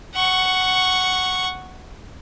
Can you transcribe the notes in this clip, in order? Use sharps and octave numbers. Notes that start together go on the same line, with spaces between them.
F#5 C#6